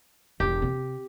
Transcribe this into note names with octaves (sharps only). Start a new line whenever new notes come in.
E1 E2 G4
C3